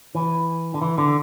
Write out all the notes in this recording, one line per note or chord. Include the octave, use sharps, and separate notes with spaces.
E3
D3
E3
D3